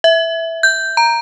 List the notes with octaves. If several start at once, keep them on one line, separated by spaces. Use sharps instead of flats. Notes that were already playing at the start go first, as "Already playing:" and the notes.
E5
G6
A#5